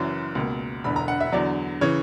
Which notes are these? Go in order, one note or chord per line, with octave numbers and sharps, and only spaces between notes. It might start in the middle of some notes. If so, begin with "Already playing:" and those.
Already playing: F#1 F#2 E3 D5
C#2 B2 A#3
E1 E2 D3 B5
A#5
F#5
E5
E2 D3 F#3 D5
C#3 E3 C#5